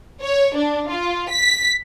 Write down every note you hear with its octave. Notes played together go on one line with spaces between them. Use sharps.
C#5
D4
F4
B6